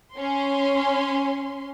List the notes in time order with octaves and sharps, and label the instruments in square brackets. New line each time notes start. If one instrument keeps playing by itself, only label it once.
[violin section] C#4 C6